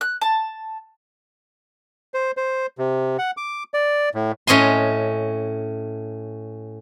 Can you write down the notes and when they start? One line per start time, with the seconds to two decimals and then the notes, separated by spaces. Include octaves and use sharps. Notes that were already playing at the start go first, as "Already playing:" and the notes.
0.01 F#6
0.21 A5
2.14 C5
2.37 C5
2.78 C3
3.19 F#5
3.37 D6
3.74 D5
4.14 A2
4.47 A2 C#4 D#5 G#5 C6